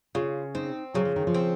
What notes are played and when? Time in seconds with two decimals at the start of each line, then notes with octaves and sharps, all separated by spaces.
0.15 C#3 F4
0.55 C4 D#4
0.94 C#3 F#3
1.05 F3
1.16 D#3
1.27 F3
1.34 C4